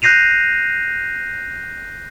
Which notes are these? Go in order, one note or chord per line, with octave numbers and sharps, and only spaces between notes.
F#6 G6 A#6 C7 D#7 F7